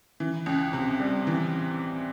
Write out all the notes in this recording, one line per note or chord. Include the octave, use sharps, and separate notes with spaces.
E3
C#2
C3
G3
E3